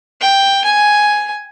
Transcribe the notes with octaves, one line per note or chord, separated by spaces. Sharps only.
G5
G#5